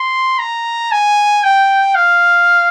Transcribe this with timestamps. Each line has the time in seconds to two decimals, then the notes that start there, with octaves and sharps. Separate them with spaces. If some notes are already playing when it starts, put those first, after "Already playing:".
Already playing: C6
0.39 A#5
0.92 G#5
1.44 G5
1.95 F5